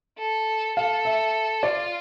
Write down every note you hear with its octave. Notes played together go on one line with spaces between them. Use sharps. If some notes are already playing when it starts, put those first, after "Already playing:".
A4
A4 F5
E5
F4 D5